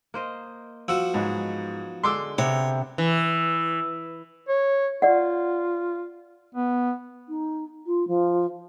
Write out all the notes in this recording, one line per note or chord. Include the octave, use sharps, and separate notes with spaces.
A#3 C5 D#5
F3 F#4 E6
G#2 F#3 B3 D#4
D3 G#3 C6 D6 E6
C3 B3 C#5
E3
C#5
F4 D5 F#5
B3
D#4
F4
F3